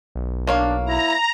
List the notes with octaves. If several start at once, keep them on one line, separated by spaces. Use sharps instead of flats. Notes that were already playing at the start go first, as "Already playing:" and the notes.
B1
A#3 D4 C#5 F5
E4 A#5